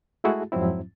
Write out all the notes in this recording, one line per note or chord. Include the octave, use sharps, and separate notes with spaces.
G#3 A3 E4 F#4 G#4
F2 G#2 F3 F#3 C4 E4